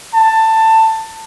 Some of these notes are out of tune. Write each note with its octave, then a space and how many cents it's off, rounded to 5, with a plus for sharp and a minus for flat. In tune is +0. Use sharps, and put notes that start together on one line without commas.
A5 +15